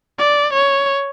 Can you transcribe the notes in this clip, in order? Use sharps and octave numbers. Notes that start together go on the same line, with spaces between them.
D5
C#5